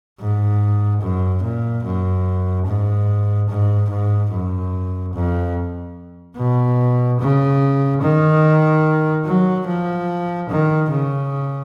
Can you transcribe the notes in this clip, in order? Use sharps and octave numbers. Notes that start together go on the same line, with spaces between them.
G#2
F#2
A#2
F#2
G#2
G#2
G#2
F#2
F2
B2
C#3
D#3
F#3
F3
D#3
C#3